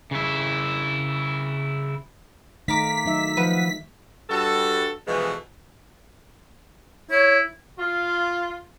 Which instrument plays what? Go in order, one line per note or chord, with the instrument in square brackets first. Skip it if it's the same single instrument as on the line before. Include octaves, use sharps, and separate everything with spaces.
[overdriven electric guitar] C#3 E4
[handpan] D#3 A3 D#4 [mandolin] F5 A#5 D6 [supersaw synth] B6
[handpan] F#3 D#4 E5
[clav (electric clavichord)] F3 [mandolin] B4 F#5
[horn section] G2 G3 F#4 A4
B2 E3 F3 G#3 A3 B3
[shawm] E4 [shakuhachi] C#5
[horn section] F4